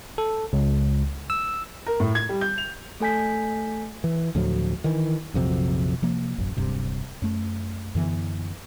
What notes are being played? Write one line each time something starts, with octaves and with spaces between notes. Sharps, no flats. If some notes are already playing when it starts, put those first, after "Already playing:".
A4
C#2
E6
A#4
A2
G#6
G3
G6
F7
A3 A4 G#5 G6 B6
E3
D2 A2 F3 F#3
D#3 E3
A#1 F2 C3 F#3
C3 F3 A#3
E1 A1 F#2
D1 G2 C3
F#2 A3
F#2 D3 E3 B3